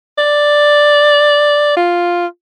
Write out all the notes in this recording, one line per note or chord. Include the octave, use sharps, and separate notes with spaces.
D5
F4